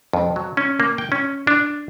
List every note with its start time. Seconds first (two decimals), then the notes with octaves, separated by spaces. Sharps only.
0.13 F2
0.36 F#3
0.57 C#4
0.80 A#3
0.98 G5
1.12 C#4
1.47 D4